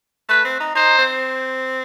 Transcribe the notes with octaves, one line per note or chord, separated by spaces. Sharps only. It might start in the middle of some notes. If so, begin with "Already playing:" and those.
A3 B4
C4
D#4
D#4 C5
C4